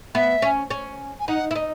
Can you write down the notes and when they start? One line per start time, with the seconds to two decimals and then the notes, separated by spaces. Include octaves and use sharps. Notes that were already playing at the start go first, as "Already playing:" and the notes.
0.14 B3 E5
0.42 C#4
0.70 C#4
1.19 G#5
1.28 D#4 F#5
1.51 E4
1.55 D#4